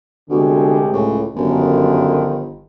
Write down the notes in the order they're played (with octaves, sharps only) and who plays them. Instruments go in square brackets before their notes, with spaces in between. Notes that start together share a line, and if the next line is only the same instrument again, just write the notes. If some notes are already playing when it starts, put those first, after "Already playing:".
[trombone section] C2 G#3 G4 [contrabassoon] B2 [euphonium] D3
[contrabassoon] C#2 [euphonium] A2
[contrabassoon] G1 [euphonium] F#2 [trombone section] D3 D#3 F3